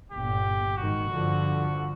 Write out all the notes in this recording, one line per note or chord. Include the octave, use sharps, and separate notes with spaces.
G1 A#2 G4
G#2 D#3 F#4
G2 D3 F3